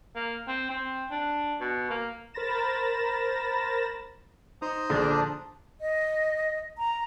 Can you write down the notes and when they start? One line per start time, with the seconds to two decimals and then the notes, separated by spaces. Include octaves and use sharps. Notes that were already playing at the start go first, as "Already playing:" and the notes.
0.15 A#3
0.48 C4
0.70 C4
1.11 D4
1.60 B2
1.90 A#3
2.34 A#4 C5 B5 A6 A#6 E7
4.62 D#4 C5 A#5 D#6
4.90 A#1 D3 D4 G#4
5.81 D#5
6.78 A#5